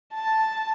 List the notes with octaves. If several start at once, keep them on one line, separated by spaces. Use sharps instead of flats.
A5